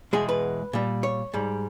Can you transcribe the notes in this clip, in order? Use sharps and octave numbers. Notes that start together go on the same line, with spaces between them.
E2 B2 G#3 G#4
B4
A#2 G3
C#5
G#2 G3